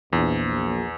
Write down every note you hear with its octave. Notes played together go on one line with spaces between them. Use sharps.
A#1 E2